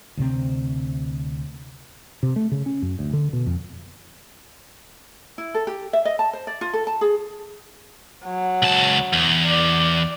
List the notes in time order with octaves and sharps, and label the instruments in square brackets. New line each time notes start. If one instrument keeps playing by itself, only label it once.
[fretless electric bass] D2 C3 C4
C3
A3
C#3
C#4
F#2
D2
D3
B2
F2
[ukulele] E4
A4
G4
E5
D#5
A5
C5
D5
F4
A4
A5
G#4
[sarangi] F#3
[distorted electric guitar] C#2 A5
E2
[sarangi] D5